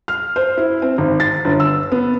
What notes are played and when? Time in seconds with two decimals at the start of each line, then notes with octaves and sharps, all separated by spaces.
0.08 F6
0.36 C5
0.57 E4
0.82 C4
0.98 G#1
1.20 A6
1.45 G1
1.60 E6
1.92 B3